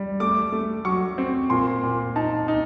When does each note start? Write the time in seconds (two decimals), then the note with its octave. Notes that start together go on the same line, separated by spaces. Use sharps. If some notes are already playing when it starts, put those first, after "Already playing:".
Already playing: G3
0.20 A3 D6
0.52 A3
0.85 F#3 C#6
1.18 C4
1.50 A#2 C6
1.83 A#2
2.16 D#4 A5
2.48 D#4